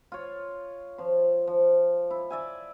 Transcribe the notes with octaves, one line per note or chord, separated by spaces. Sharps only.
F4 C#5
F3 C6
F3
E4
D5 E5 G#5